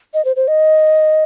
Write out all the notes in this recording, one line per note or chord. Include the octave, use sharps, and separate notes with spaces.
D#5
C5
C5
D#5